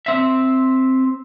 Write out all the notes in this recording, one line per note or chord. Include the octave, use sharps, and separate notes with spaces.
C4 E5